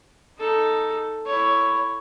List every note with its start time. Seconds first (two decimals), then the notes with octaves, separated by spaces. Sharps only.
0.38 D#4 A4
1.26 E4 C#5